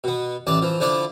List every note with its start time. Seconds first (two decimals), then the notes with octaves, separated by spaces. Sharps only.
0.04 B2 B3
0.47 A1 E3 D5 A5
0.62 E3 F3
0.80 D3 F3 D4 E4 D5